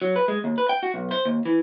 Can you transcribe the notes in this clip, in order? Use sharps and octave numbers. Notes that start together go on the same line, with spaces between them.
F#3
B4
G#3
D#2
B4
G5
F#4
B1
C5
D#2
E3